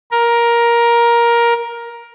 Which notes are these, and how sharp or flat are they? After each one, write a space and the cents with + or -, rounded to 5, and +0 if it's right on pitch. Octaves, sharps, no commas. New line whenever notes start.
A#4 +15